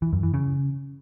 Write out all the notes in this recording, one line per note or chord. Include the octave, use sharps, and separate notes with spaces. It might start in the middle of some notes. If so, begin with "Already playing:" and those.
E3
F#2
E3
C#3